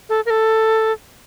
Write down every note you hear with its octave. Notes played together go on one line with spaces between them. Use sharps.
A4
A#4
A4